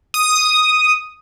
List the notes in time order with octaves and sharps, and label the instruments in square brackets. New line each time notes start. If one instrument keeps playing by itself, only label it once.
[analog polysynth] D#6